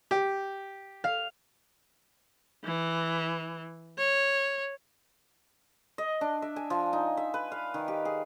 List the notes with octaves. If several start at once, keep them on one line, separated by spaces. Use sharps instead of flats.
G4
F5
E3
C#5
D#5
D4
E5
G#5
F3
D#4
E5
B4
F5
D#3
G4
G#4